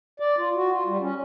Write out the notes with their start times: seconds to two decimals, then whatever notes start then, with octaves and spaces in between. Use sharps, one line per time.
0.20 D5
0.38 F4
0.55 F#4
0.71 F4
0.86 G3
1.01 C#4